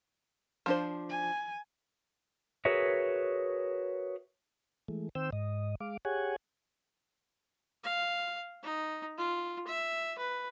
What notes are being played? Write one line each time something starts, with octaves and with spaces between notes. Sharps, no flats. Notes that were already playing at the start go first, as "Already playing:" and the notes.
F3 D4 C5
G#5
F#4 G#4 A#4 B4 C#5 E5
E3 G#3 A3
D#3 C4 C5 G5 E6
G#2 D#5
G#3 F5 D6
G4 G#4 C#5 F#5 G#5
F5
D#4
F4
E5
B4